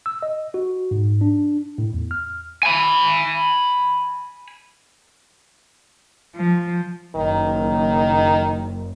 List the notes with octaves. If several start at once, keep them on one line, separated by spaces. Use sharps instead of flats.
E6
D#5
F#4
G#2
D4
A2
E2
F6
G#5 B5
F3
F#1 D#3